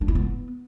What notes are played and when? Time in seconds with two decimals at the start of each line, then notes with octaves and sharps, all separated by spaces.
0.01 D4
0.08 E4
0.15 B3